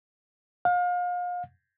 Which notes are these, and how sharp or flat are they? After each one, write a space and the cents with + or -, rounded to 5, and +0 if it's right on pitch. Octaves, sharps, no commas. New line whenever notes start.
F5 +35